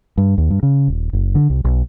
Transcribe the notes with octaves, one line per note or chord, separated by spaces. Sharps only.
G2
D#2
G2
C#3
D#1
F#1
D3
C2
B1